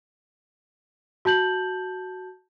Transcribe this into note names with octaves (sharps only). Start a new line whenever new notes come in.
F#4 A5 G6 F#7